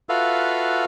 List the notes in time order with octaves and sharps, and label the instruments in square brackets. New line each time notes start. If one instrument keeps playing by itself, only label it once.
[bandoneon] F4 F#4 A4 B4 E5 F5